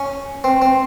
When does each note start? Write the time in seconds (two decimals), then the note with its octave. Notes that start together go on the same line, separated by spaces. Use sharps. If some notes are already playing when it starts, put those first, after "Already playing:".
Already playing: C#4
0.44 C4
0.62 C4